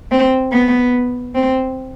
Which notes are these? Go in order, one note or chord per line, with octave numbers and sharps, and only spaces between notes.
C4
B3
C4